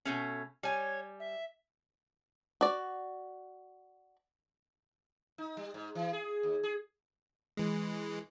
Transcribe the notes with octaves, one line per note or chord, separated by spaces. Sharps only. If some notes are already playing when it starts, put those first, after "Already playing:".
B2 A3 C#4
G3 C#5 G#5
E5
F#4 D5
D#4
G3
G#2
E3
G#4
D#2
G#4
E3 G#3